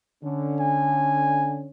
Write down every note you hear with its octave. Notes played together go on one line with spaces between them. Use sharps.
D3 C#4
G#5